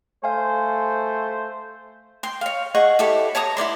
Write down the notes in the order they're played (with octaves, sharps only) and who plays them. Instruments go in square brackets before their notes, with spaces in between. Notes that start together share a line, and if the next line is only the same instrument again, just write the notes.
[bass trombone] A3 [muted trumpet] C5 [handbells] F5 G#5
[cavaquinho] G5 C6
C#5 F5
G#4 D#5 F#5 C#6
E4 G4 A4 C#5
C#5 A5 A#5 D#6
E4 C5 D5 C6